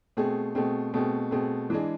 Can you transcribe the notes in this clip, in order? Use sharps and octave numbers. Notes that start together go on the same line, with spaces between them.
B2 A3 C4 G#4
B2 A3 C4 G#4
B2 A3 C4 G#4
B2 A3 C4 G#4
E3 G#3 D4 G#4